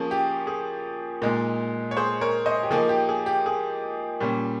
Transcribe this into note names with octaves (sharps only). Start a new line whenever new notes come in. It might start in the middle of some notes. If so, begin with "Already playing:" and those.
Already playing: F3 A#3 C#4 G#4
G4
G#4
A#2 G#3 D#4
C#5
G#4 C5
A#4 C#5
C5 D#5
G4
F3 A#3 D#4 G#4
G4
G#4
G4
G#4
A#2 G3 C#4